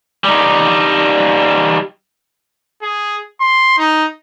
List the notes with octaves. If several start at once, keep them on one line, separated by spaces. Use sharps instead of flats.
G3 D#4
G#4
C6
D#4